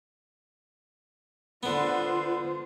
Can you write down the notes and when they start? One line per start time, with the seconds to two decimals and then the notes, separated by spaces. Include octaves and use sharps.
1.63 D3 B3 F4 C5